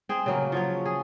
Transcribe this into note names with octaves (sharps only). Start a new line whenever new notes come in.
C4 G#4
C#3 F#3 A#3
F3 F#3 C#5
G#4